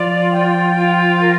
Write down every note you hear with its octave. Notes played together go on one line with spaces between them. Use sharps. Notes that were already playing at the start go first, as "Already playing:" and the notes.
Already playing: F3 F4 D5
G5
F4
A#4